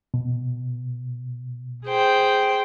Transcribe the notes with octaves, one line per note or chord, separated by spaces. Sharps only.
B2
G#4 C5 G5